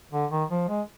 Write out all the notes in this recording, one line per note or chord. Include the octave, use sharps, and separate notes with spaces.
D3
D#3
F3
G#3